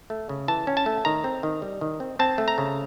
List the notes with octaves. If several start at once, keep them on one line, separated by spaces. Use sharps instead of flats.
A3
C#3
E3 A5
C#4
A5
A3
D#3 A#5
C4
D#3
G3
D#3
C4
C4 A5
A3
A#5
C#3